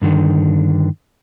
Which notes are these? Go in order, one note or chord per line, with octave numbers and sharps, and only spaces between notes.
G2 D3 D#3